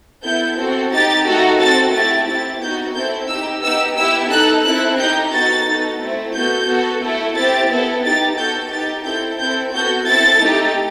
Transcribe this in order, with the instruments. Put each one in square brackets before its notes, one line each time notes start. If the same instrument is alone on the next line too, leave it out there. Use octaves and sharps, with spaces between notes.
[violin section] B3 E4 A4 G6
C4 F#4 A4
D#4 G4 A6
A3 D#4 F#4 A4
C4 F#4 A4 A6
A3 E4 G4 A6
C4 E4 G4 A6
B3 D#4 F#4 G6
C4 E4 A4 G6
D#4 G4 E6
B3 D#4 G4 E6
B3 E4 G4 E6
D#4 A4 F#6
C4 E4 A4 F#6
D#4 G4 G6
B3 D#4 F#4 A4 A6
B3 D#4 F#4 A4
A3 C4 E4
B3 F#4 A4 G6
B3 F#4 A4
A3 E4 A4
C4 E4 G4 A6
B3 E4 A4
D#4 G4 A6
B3 F#4 A4 G6
D#4 G4 A6
C4 E4 A4 G6
C4 E4 A4 G6
B3 F#4 A4 G6
C4 E4 A4 A6
A3 D#4 G4